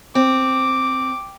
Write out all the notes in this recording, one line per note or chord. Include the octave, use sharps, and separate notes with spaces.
C4 D6